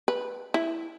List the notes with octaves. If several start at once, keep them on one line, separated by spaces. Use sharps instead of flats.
B4
E4